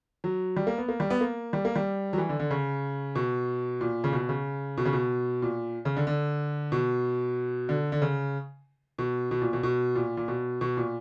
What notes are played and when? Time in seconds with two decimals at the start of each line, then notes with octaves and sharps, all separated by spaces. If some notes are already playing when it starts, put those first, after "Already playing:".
0.24 F#3
0.57 G3
0.67 A#3
0.78 B3
0.88 A#3
1.00 G3
1.10 B3
1.21 A#3
1.53 G3
1.65 A#3
1.76 G3
2.13 F#3
2.18 E3
2.29 D3
2.40 D3
2.51 C#3
3.15 B2
3.81 A#2
4.04 C#3
4.13 B2
4.29 C#3
4.77 B2
4.85 C#3
4.93 B2
5.42 A#2
5.85 C#3
5.97 D3
6.07 D3
6.72 B2
7.69 D3
7.92 D3
8.02 C#3
8.98 B2
9.31 B2
9.41 A#2
9.53 B2
9.63 B2
9.95 A#2
10.17 A#2
10.28 B2
10.61 B2
10.77 A#2